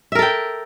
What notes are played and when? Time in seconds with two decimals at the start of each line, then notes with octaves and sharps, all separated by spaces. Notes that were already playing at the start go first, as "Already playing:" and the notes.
0.12 E5
0.15 A#4
0.19 A4
0.22 G5